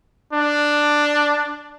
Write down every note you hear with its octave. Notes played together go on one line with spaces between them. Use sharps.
D4